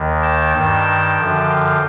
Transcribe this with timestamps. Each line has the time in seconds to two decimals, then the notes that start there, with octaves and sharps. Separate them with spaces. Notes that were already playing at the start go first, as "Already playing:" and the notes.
Already playing: D#2 D#3
0.22 G5 A5
0.54 G2 D#3 G5 A5
1.19 F#2 D3 F3
1.50 F5 G5